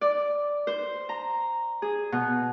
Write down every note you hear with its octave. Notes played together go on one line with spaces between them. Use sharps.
D5
C5
A#5
G#4
B2